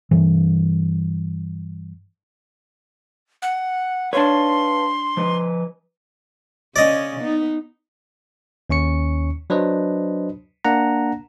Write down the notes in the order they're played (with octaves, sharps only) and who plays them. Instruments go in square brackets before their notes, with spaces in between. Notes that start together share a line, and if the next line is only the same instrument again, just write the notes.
[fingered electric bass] G2 E3
[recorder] F#5
[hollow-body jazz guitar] D4 C#5 [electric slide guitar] B4 F5 A5 [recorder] C6
[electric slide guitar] F3 B4 D#5
[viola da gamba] C#3 C#4 [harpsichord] D5 D#5
[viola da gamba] B3 D#4
[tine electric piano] D#2 C#4 C#6 C#7
F#3 D4 B4 C5 D#5
A#3 D4 F#5 A#5